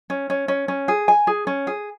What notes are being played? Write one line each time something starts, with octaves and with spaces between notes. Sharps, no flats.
C#4
C#4
C#4
C#4
G#4
G#5
G#4
C#4
G#4